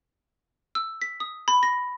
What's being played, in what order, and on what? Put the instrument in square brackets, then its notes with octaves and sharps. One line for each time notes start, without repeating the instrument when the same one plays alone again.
[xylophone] E6
B6
D#6
B5
A#6